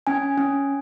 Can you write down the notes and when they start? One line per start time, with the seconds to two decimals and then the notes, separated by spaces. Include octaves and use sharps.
0.07 C#4 G#5
0.38 C#4